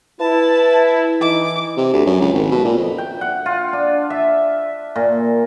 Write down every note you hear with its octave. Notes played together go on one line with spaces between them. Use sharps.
E4 B4 A5
E3 D#4 D6
C3
D2
F#2
C#2
G#1
B2
A#2
F2
G5
F#5
F4
D4
E5
A#2